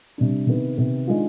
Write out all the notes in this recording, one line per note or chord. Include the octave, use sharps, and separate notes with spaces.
C3 G3 D4
C3 D#3 B3
C3 D#3 B3
D#3 G#3 D4 F4